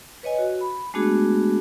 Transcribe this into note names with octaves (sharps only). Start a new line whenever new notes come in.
B4 C#5 D#5 G#5
F#4
B5
G#3 A3 B3 D4 F#4 G#4